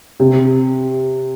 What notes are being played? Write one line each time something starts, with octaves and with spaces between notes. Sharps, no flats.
C3